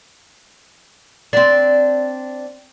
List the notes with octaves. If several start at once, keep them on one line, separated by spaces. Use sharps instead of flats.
C4 D4